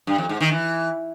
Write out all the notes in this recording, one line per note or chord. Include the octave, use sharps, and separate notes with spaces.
G2
F2
G#2
D#3
E3